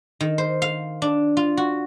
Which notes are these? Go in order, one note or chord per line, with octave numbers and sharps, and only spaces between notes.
D#3
C5
F5
D4
F4
F#4